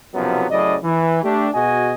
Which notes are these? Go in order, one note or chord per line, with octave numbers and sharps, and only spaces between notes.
B1 F#2 C3 F3 F#3 B3
F#2 A2 C#3 D5 D#5
E3
A3 D4 G4
B2 F#4 G#4 D#5 G#5